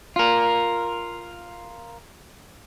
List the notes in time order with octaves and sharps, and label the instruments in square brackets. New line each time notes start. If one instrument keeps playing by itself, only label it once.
[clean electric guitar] F4 A#4